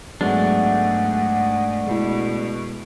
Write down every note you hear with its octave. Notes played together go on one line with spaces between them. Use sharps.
G#2 F#3 G#3 A3 B3 D4 F#5
B2 G#3 E4